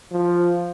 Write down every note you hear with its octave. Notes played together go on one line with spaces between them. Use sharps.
F3